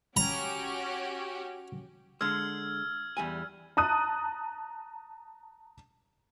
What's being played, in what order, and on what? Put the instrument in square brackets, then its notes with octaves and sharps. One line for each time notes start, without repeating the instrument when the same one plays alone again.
[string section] C#4 F#4 G4 [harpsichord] A#5
[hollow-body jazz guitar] D3 G#3 [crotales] E6 F6 G#6
[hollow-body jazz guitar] E2 G3 G#5
[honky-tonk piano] A5 A#5 D#6 F#6 D#7